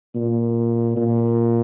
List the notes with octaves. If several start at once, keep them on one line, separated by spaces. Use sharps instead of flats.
A#2
A#2